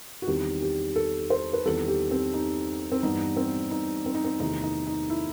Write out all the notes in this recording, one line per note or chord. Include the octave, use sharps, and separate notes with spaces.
F#4
E2 D#3 G3 C4 G4
G4
A4
C5
B4
E2 D#3 G3 C4 A4
G4
C4
D#4
C4
G2 E3 B3 D#4
C4
D#4
C4
D#4
C4
E2 C3 D#3 A3 C4 D#4
D#4
D#4
E4